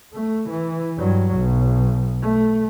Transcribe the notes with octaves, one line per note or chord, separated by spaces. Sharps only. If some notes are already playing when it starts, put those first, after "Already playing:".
A3
E3
G2 F#3
B1
A3